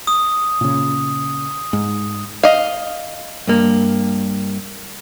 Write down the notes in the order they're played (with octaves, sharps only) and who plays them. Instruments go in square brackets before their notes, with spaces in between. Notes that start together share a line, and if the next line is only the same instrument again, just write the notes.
[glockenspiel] D#6
[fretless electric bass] A#2 C#3
G#2
[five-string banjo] D#5 F5
[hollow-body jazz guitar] G2 A#3